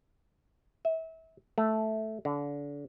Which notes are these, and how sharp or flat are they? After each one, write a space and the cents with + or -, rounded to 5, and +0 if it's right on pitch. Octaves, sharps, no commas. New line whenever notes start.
E5 -30
A3 -5
D3 -30